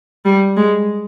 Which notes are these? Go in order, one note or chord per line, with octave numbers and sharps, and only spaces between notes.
G3
G#3